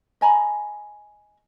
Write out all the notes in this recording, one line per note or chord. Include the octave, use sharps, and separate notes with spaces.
D#5 G#5 A#5 B5